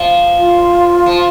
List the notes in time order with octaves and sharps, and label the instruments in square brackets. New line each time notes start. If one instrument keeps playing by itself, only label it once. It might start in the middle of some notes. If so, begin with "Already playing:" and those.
Already playing: [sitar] F3
[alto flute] F4
[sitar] F3